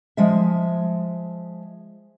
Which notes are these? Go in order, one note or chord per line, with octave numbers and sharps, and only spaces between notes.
F3 G#3 E5